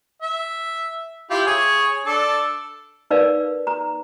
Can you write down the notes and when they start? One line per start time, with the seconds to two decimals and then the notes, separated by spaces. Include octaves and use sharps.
0.22 E5
1.30 E4 F4 G4
1.46 G#4 C#5
2.06 D4 A4
3.11 D#4 A#4 B4 D5 F5
3.67 A#5